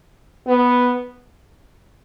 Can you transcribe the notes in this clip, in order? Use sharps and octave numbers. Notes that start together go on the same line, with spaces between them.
B3